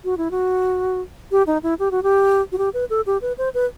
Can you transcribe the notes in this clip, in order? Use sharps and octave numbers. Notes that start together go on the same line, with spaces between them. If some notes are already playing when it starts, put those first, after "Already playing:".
F#4
E4
F#4
G4
D#4
E4
G4
F#4
G4
F#4
G4
B4
A4
G4
B4
C5
B4